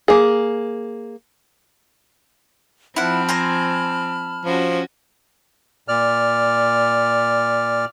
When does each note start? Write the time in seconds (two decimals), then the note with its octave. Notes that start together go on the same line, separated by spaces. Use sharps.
0.08 A#3 G#4
2.96 F3 C4 E4 F#5 A5 B5 F6
3.29 C5 G#5 A#5
4.45 F3 C#4 F#4
5.88 A#2 D5 F6